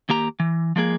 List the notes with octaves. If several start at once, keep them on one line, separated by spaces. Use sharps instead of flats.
D#2 A#3 G4 A#5
E3
F3 G#3 A#3 G#4